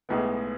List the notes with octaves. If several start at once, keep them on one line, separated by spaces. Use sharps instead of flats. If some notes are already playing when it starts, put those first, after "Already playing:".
B1 A2 G#3 B3